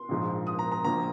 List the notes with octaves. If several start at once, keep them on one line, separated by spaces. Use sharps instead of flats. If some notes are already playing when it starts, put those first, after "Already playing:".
Already playing: C6
A#1 G#2 F3
D#6
A#5
A#5
A#1 A#2 F3 A#5